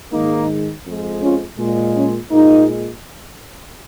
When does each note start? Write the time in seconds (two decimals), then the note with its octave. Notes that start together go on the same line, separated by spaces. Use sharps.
0.13 G#2 D#3 G#3 A#3 D#4
0.86 F2 F3 G#3
1.22 C#4 F4
1.58 A#2 G#3
1.95 C#4
2.31 A#2 G#3 A#3 D#4